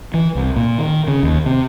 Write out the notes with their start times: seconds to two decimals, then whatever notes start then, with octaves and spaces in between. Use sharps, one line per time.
0.14 E3
0.35 C2
0.57 A#2
0.78 D#3
1.08 C#3
1.23 D#2
1.46 C3